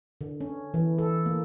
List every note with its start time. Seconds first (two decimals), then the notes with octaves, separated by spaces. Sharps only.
0.21 D3
0.41 C#4
0.74 E3
0.98 A4
1.26 A#3